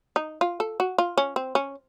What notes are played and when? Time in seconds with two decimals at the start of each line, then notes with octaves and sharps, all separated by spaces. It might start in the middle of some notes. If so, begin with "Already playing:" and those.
0.16 D#4
0.41 F4
0.60 A4
0.80 F#4
0.98 F4
1.18 C#4
1.36 C4
1.55 C#4